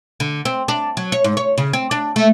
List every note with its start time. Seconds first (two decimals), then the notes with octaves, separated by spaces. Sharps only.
0.20 D3
0.45 C4
0.68 D4
0.97 F#3
1.12 C#5
1.24 G#2
1.37 C#5
1.58 C#3
1.73 C4
1.91 D4
2.16 A3